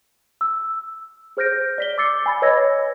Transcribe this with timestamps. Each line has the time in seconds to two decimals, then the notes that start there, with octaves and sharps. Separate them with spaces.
0.41 E6
1.37 G#4 C5 F6 G6 A#6 D7
1.78 D5 B6 G7
1.98 D6 E6 A6 C7 C#7
2.26 G#5 B5 A6
2.42 B4 C#5 D#5 E6 G#6 A#6